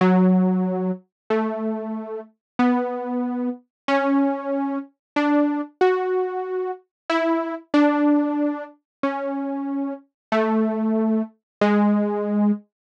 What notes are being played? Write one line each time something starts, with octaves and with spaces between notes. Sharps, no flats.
F#3
A3
B3
C#4
D4
F#4
E4
D4
C#4
A3
G#3